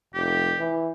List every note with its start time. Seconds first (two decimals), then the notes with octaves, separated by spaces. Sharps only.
0.14 F1 G4
0.59 E3